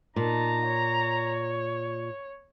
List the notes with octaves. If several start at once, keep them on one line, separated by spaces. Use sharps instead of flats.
A#2 D#4 A5 A#5
C#5